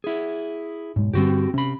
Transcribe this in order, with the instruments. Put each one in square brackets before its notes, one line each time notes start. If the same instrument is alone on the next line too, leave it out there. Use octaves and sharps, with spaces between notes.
[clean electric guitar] E4 G#4
[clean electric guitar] B1 [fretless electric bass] G#2 G#3
[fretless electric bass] G2 D3 G3 [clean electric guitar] C4 F#4 G4
[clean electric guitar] C3 B5 [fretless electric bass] C#4